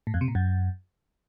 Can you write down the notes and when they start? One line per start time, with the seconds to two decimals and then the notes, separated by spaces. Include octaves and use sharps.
0.07 A2
0.14 F2
0.21 C3
0.28 A#2
0.35 F#2